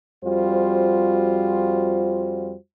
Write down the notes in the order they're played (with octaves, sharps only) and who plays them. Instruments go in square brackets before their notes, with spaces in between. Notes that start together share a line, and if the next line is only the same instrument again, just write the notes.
[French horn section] F2 G3 F4 F#4 C5